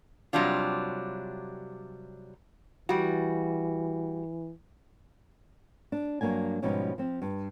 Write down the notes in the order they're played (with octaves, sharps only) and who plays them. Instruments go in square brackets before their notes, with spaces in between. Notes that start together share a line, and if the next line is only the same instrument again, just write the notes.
[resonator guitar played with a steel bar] C3 F#3 G3 D4 F4
[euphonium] E3 [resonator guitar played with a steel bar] G3 F#4
[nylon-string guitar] D4
G2 F#3 A#3 D4 G#5
G#2 B2 F3 G3 C#4 D#4
F3 C4
G2